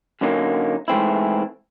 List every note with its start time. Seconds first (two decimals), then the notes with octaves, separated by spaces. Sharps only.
0.21 F#2 D3 F#3 A#3 D#4
0.88 G#2 E3 A3 C4 E4